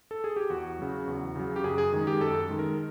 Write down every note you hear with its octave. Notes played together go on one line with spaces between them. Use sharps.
A4
G#4
G4
E2 F#4
C#3 F#3
E2
C#3 F#3
G4
F#2 G#4
G#4
D#3 G#3
G4
F#2 A4
D#3 G#3
A#4